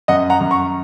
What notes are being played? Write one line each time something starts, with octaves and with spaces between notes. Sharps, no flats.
F#2 D#5 F#5
F#5 A#5
F#2
A#5 C#6